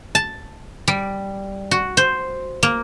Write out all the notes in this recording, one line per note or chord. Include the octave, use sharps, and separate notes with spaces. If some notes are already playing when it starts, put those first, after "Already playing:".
A5
G3
F#4
C5
A#3